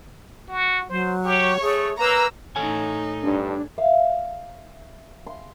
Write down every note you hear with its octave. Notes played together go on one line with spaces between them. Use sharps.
F#4
F#3 C5
G4 C#5
A3 G#4
A#3 B4 A#5 E6
A2 D#4 A4 C#5 G#5
G2 D4
E5 F5
C6